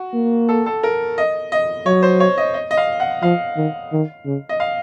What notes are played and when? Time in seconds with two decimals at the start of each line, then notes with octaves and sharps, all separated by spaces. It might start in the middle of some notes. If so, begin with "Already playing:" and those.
Already playing: F#4
0.14 A#3
0.49 A4
0.66 A4
0.83 A#4
1.18 D#5
1.52 D#5
1.86 F#3 C#5
2.03 C5
2.20 C#5
2.38 D#5
2.54 D#5
2.71 D#5
2.77 F5
3.00 F#5
3.22 F3 F5
3.57 D#3
3.92 D#3
4.25 C#3
4.49 D#5
4.60 F5